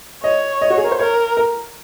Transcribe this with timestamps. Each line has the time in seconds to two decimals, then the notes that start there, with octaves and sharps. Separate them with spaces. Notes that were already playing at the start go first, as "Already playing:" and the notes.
0.24 C#5 D#5
0.62 D#5
0.70 F#4
0.77 G#4
0.84 A#4
0.92 C5
0.99 A#4 C#5
1.37 A#4